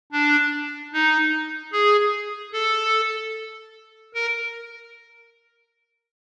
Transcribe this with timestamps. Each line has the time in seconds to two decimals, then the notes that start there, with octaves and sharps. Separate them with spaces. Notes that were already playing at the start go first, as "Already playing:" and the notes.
0.12 D4
0.93 D#4
1.73 G#4
2.53 A4
4.14 A#4